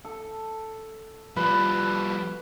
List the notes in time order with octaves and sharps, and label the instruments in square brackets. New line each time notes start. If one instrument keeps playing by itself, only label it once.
[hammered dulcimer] A4
[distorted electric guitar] F3 G3 [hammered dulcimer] B4